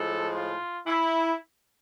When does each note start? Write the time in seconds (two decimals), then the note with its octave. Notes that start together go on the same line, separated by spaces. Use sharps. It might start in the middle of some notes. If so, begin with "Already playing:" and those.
Already playing: A2 F3 G#3 A4
0.33 F4
0.87 E4